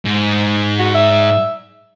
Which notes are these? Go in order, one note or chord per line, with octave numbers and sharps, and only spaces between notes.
G#2
F#4
E5